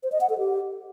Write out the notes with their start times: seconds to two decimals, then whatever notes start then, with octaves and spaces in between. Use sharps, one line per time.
0.03 C5
0.12 D#5
0.21 F#5
0.29 A4
0.38 G4